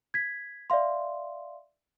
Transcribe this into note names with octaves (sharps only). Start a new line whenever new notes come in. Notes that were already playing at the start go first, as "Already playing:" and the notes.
G#6 B6
D5 E5 F5 C6